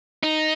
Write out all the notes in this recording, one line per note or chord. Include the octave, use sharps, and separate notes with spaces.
D#4